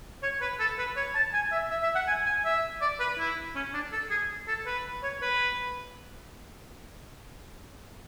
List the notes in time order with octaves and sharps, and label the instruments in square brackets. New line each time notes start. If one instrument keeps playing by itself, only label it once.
[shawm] C#5
B4
A4
B4
C#5
A5
G#5
E5
E5
E5
F#5
G#5
G#5
E5
D5
B4
E4
C#4
D4
A4
G#4
A4
B4
C#5
B4